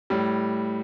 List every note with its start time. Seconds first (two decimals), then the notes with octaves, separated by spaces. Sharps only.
0.10 A2 G3